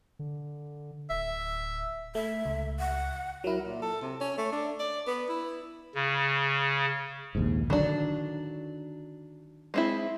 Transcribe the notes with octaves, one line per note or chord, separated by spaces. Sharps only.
D3
D1 E5
A3 E5
C#2
F#5
F#3 E4 A#4
A#2
A4
C3
C#4
A3
D4
D5
B3
E4
C#3
A#1 D#2 G#2
D3 D#3 F#3 D4
G#3 C4 E4